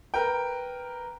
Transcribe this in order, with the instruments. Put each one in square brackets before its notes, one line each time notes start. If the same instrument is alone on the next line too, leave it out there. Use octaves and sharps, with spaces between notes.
[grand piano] A#4 B4 G5